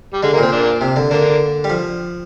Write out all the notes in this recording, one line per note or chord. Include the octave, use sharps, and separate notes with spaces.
G3
D3 G#3
A#3
A#2 C4
A#3 D4
C3
D3
D3 A#3 D4
G3
F3